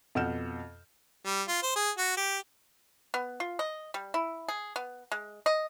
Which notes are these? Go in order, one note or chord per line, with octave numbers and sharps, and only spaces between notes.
F2 B2 F#5 F6 G6 E7
G3
F4
C5
G#4
F#4
G4
B3
F4
D#5
G3
E4
G#4
B3
G#3
D#5